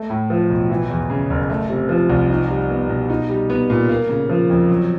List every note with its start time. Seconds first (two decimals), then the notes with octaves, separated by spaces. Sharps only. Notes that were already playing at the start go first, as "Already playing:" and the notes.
Already playing: A3
0.10 A2
0.30 F3
0.50 B1
0.70 E3
0.90 E2
1.10 C#3
1.30 F#1
1.50 A3
1.69 C3
1.89 F3
2.10 C2
2.30 D#4
2.50 G3
2.70 B3
2.89 B2
3.10 D#4
3.29 G3
3.50 B3
3.70 A#2
3.89 A#3
4.09 C#3
4.29 F3
4.50 F2
4.69 F#3